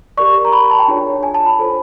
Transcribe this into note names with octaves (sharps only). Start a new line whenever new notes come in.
G4 A#4 D5 C#6
A#5
B5
A5
G5
D4 F4 G#4 C#5
G#5
A5
B5
F4 A4 C5